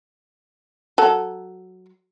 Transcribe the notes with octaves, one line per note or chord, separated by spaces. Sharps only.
F#3 A4